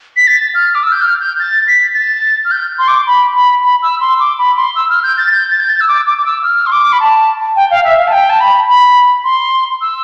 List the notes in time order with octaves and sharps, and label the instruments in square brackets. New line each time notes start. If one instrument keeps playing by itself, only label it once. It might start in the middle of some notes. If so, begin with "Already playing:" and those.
[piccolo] B6
A6
F6
D6
E6
G6
F6
G6
A6
B6
A6
F6
G6
C6
D6
B5
B5
B5
E6
C6
D6
B5
C6
E6
F6
G6
A6
G6
A6
G6
A6
E6
D6
D6
D6
E6
F6
C6
D6
B5
A5
G5
F5
E5
F5
A5
G5
A5
B5
B5
C6
E6